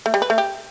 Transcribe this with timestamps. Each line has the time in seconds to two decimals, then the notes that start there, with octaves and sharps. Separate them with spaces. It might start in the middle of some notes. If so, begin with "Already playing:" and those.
0.06 A3
0.14 G3
0.22 B4
0.30 A3
0.38 G4